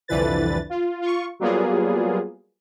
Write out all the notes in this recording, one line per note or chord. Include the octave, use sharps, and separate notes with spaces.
C2 F2 D3 E3 B4 A6
F4
F4 C#6
F#3 G3 A#3 B3 F4 G#4